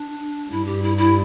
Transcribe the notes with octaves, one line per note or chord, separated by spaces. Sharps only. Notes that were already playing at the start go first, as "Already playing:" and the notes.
Already playing: D4
G2 E4
G4
E4
E4